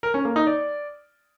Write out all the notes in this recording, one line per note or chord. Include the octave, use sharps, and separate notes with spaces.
A#4
C#4
A#3
D#4
D5